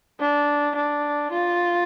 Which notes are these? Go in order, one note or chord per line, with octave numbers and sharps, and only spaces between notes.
D4
D4
F4